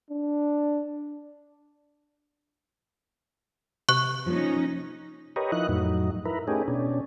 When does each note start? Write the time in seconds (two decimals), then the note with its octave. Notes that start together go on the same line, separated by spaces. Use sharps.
0.10 D4
3.89 C3 C#6 F#6
4.26 F3 A#3 C#4 D#4
5.36 G4 A#4 B4 C#5 D#5
5.52 F3 D#4 E4 D#5 F#6
5.69 F2 A2 F#3 D#4
6.25 E4 A#4 B4
6.48 A3 C#4 D#4 G4 G#4
6.68 B2 C#4 D4